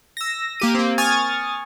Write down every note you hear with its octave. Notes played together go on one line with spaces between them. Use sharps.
E6 A#6
A#3 G4 D#7
A#3 C4
G#5 C#6 D#6 F6 G#6 A6